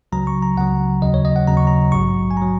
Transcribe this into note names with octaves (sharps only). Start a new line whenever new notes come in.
C#2 C#3 F#3 A#5
C#6
A#5
C#2 C#3 F#3 F#5
D#2 C#3 F#3 D#5
C#5
D#5
F#5
D#2 C#3 F#3 A#5
C#6
A#5
A#1 G#2 F#3 C#6
G#5
F#3 A#5